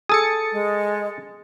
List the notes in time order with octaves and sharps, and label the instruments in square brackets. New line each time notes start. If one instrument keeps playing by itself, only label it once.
[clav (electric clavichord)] G#4 A4 [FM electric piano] D#6 A6 C#7
[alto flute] G#3